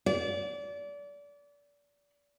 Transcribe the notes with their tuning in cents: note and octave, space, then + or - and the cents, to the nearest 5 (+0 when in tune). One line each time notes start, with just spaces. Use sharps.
D5 -30